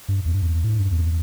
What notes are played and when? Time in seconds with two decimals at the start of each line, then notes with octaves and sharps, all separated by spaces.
0.08 G2
0.25 E2
0.34 G2
0.42 E2
0.64 A2
0.78 G2
0.92 E2